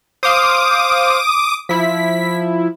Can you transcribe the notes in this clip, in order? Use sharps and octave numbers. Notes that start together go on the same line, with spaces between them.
C5 F5 D6 D#6
F3 E4 B6